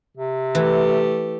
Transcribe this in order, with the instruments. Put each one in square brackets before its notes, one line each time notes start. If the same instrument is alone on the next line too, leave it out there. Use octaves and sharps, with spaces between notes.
[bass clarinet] C3
[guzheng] E3 [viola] A3 G4